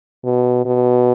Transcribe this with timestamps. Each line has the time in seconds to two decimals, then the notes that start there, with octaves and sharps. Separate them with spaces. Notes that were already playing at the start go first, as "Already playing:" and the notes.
0.24 B2
0.65 B2